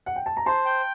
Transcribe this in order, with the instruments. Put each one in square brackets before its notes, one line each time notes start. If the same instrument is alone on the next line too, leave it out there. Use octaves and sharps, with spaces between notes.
[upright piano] F#5
G5
A5
A#5
[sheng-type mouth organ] C5 [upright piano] A5 C6
[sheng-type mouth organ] G5